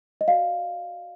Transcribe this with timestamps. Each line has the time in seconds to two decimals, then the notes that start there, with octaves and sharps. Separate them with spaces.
0.21 D#5
0.28 F#4 D5 F5